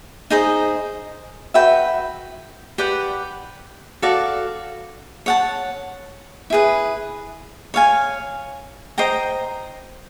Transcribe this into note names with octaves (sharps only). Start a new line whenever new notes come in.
D#4 G#4 C5 D#5
F#4 B4 E5 G5
G4 B4 D5 F#5
F#4 A4 D5 F5
C#5 F#5 A5
E4 G#4 B4
C#5 F5 G#5
C5 D#5 G5 A#5